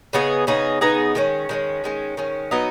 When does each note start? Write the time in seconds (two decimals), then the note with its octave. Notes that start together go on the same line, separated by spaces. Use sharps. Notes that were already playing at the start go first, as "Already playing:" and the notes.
0.13 C#3 B3 D#4 G#4
0.47 C#3 B3 D#4 G#4
0.81 C#3 B3 D#4 G#4
1.15 D#3 G#3 C#4
1.49 D#3 G#3 C#4
1.84 D#3 G#3 C#4
2.17 D#3 G#3 C#4
2.51 F#3 B3 D#4